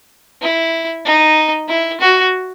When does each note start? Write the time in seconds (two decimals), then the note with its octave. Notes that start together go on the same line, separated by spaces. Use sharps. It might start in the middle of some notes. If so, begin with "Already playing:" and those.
0.42 E4
1.05 D#4
1.69 E4
2.00 F#4